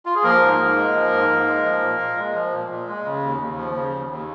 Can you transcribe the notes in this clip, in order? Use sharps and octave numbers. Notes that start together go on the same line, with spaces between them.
F4
G#4
F3 A#3 A#4
G#2
G#2
G#3
F3
G#2
G#2
G#3
F3
A#2
A#2
G#3
F3
A#2
A#2
G#3
C#3
D#2
D#2
F3
C#3
D#2
D#2